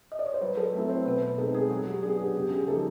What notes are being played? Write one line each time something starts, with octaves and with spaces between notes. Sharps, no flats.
D#5
D5
C#5
C5
F#3 B4
A4
A3 C4 E4
C5
B2 B4
B4
G#3 C4 D#4 A4
G#4
F#3 F#4
G4
B3 D4 G#4
G4
C#3 G4
G#4
F3 A#3 D#4 A4